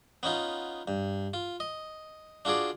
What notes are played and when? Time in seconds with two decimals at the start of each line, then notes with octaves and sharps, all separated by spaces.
0.23 B3 C#4 D#4 F4
0.88 G2
1.34 F4
1.60 D#5
2.45 D4 F4 F#4 G#4 D5